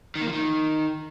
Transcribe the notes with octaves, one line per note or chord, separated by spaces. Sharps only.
D#3
A#3
F3
D#3